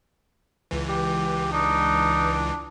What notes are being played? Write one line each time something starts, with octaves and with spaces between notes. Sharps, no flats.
C#2 E3
G4
D4 D#4